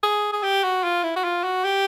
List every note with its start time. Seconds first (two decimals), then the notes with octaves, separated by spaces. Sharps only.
0.03 G#4
0.33 G#4
0.43 G4
0.64 F#4
0.84 F4
1.03 E4
1.16 F#4
1.24 F4
1.44 F#4
1.64 G4